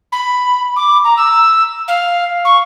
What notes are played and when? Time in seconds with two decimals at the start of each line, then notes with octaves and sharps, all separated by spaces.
0.12 B5
0.76 D6
1.04 A#5
1.17 E6
1.88 F5
2.45 C#6